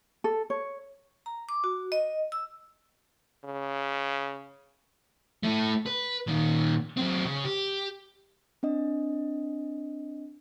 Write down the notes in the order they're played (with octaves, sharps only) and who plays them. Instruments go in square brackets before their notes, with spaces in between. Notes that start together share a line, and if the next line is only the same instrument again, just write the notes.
[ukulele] A4
C#5
[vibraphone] A#5
D6
F#4
D#5
E6
[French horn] C#3
[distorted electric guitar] A3 E4
B4
A#2 D#3
F#3 C4
C#3
G4
[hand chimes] C4 D4 D#5